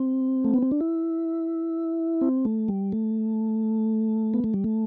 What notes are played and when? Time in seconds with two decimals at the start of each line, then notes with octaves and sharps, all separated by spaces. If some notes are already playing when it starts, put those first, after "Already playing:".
Already playing: C4
0.44 A3
0.54 B3
0.62 C4
0.71 D4
0.81 E4
2.21 C4
2.45 A3
2.68 G3
2.92 A3
4.34 B3
4.44 A3
4.54 G3
4.64 A3